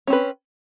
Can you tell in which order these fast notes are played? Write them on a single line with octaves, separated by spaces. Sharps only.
C#4 C4 B4